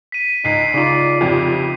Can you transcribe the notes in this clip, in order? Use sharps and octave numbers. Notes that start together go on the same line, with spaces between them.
B6 D#7
C#2 D#4 B6 C7
C#3 D#4 F4 D5
F2 C3 F3 G4